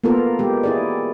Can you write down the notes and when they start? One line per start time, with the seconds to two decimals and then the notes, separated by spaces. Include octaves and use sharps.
0.04 A#3 B3 F4 A4 A#4
0.39 G#3 G4
0.63 E4 G#4 D5